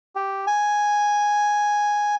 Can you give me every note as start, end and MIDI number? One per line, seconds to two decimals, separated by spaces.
0.15 0.45 67
0.47 2.15 80